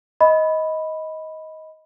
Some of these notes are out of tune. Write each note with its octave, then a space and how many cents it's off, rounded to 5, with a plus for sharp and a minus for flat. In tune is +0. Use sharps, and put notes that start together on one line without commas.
D#5 +20 B5 +0